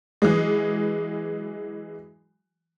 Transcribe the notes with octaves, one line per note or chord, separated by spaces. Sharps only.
E3 F#3 G#3